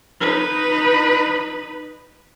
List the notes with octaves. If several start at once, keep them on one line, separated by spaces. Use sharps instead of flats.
D#4 B4